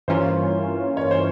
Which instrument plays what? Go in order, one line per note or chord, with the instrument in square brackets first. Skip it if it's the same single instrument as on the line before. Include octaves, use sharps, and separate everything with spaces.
[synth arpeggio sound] G2 E3 A#3 C#4 F4 [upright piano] C5
[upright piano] C#5
C5